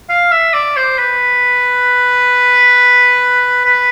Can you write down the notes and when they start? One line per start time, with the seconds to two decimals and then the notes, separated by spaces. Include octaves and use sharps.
0.10 F5
0.32 E5
0.53 D5
0.76 C5
0.98 B4
3.65 B4